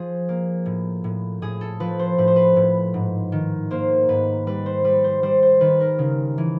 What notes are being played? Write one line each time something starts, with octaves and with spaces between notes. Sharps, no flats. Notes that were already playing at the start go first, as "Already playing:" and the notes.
Already playing: F3 G#4
A#3
A2
A2
A2 G#4
A4
F3 B4
C5
A2 B4
C5
B4
A2
G#2
D#3
A#3 C5
G#2 B4
G3 B4
C5
G3 B4
C5
G3 C5
C5
D#3 B4
A#4
C#3
E3